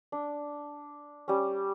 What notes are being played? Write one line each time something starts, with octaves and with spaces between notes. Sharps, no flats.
D4
G3 C#4